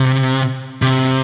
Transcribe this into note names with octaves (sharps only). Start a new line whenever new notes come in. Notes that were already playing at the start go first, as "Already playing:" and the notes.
Already playing: C3
C3